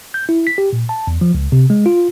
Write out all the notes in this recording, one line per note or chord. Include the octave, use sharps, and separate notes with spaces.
G6
E4
B6
G4
A#2
A5
E2
F3
C#2
C3
G#3
F4